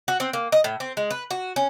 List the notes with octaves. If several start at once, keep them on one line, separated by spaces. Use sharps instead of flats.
F#4
C4
A#3
D#5
A2
C4
G#3
B4
F#4
C#4